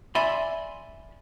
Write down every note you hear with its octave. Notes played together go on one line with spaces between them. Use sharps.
D5 E5 G#5 B5 C6